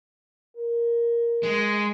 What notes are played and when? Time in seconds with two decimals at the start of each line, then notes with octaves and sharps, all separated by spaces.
0.57 A#4
1.43 G#3